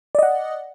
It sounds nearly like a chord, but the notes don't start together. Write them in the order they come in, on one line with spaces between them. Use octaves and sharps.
D5 D#5 F#5